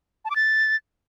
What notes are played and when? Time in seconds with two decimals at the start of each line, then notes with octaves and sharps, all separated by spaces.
0.25 A5
0.30 D6
0.36 A6